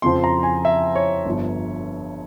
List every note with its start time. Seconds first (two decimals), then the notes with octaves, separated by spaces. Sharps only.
0.02 F2 C#3 F3 C4 C6
0.24 A#5
0.43 G#5
0.65 E5
0.95 C#5
1.26 G1 G2 F3